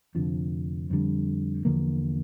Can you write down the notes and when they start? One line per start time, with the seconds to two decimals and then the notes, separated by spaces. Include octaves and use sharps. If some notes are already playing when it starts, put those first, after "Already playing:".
0.15 F1 F2 D3 F3
0.90 F2 D3 G3
1.65 E2 D3 F3 A#3